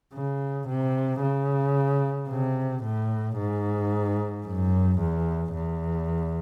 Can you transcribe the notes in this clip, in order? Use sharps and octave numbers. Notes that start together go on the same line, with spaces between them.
C#3
C3
C#3
C3
A2
G#2
F#2
E2
E2